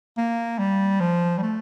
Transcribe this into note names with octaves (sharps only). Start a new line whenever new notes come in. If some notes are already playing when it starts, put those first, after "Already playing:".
A#3
G3
F3
G3
A3